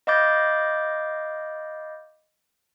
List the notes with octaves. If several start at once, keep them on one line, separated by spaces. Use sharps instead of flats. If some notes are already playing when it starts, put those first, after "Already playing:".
D#5 F5 B5 D6 G6 A6